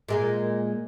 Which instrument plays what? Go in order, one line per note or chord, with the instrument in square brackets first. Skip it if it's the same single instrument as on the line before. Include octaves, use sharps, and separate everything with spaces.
[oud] A#2 G#3 A#3